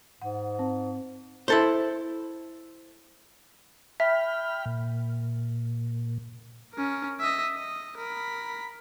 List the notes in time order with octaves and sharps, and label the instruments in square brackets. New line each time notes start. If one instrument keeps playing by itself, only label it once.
[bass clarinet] G#2 [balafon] F#5
[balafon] C4
[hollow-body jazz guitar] E4 A4 C5
[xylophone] E5 [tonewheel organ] G5 B5 F6
[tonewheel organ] A#2
[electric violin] C#4 A#4
D#5 E5
D#5
A#4 B5